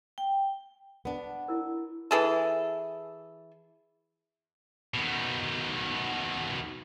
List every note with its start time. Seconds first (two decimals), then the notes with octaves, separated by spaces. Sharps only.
0.18 G5
1.05 B3 D4
1.48 E4 A#4
2.11 E3 G#4 A4
4.94 B2 D#3